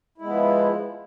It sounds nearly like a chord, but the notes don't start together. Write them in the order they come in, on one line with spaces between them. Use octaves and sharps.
E4 G#3 B3 F3